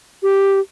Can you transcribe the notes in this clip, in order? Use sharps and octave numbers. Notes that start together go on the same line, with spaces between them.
G4